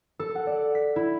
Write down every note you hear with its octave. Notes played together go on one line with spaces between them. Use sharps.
A4
F#5
D5
B6
E4